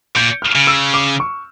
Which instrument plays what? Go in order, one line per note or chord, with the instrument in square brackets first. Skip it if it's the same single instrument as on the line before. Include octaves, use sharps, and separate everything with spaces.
[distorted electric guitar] A#2 [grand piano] G6
[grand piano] F6
[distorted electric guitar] C#3
[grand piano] E6
D6
C#6